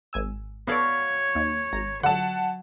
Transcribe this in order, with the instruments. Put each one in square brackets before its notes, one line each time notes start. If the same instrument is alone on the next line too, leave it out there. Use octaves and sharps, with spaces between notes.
[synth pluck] G#1 G#5 E6
[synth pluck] B3 A4 D5 [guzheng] F#4 F5 B5 [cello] C#5
[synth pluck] D#2
G#1 A#5
[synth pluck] D3 [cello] F#3 [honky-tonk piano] F#5 A5